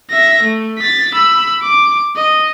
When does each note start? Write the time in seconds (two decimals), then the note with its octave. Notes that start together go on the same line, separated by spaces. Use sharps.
0.10 E5 A#6
0.43 A3
0.78 A6 B6
1.14 B5 E6
1.62 D6
2.16 D#5